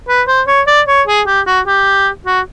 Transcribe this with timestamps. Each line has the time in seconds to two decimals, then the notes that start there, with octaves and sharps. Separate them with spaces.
0.09 B4
0.28 C5
0.47 C#5
0.67 D5
0.88 C#5
1.07 G#4
1.27 G4
1.47 F#4
1.67 G4
2.27 F#4